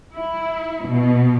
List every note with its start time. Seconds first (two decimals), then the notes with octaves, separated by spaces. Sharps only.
0.14 E4
0.86 B2